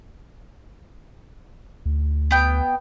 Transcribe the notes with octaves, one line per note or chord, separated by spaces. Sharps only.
D2
B3 G5